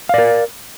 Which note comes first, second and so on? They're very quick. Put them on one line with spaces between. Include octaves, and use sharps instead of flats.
F5 D5 A#4